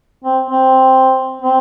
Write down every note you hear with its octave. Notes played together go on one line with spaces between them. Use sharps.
C4
C4
C4